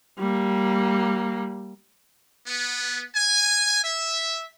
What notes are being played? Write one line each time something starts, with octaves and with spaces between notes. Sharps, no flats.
G3 A#3
B3
G#5
E5